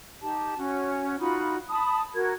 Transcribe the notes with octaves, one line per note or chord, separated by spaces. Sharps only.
D#4 G4 A5
C#4 F#4
D#4 F4 F#4 B5
A5 B5 D#6
F#4 A#4 G#6